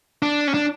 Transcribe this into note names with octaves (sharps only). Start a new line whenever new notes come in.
D4
C#4
D4